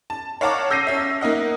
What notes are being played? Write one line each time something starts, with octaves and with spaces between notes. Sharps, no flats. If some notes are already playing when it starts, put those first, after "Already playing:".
A5
C#5 F5 F#5 A5 A#5 D6
E6 G6 A#6 C7 D#7
C#4 E5
A#3 D#4 D#5 F#5